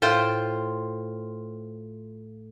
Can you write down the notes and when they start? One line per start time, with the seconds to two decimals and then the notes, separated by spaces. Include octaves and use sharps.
0.02 A2 F4 C5 G5